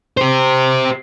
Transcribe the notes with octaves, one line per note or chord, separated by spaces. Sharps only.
G4 C5